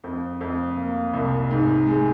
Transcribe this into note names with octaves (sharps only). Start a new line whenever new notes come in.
F2
F2
A#3
C2
G#2
G#3